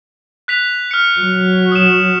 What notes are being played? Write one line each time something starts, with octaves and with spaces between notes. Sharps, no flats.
F#6 B6 F7
F6 C#7
F#3
D#6 E7